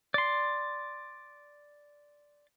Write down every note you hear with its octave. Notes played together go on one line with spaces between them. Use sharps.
D5 C6